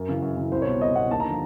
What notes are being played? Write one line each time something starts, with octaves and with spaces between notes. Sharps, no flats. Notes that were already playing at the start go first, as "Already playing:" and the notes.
Already playing: F#2 A#4
C#3 E3
F#2
C#3 E3
C2 C5
C#5
B2
C2 D#5
B2 F#5
D#2 A5
A#5
D3 F3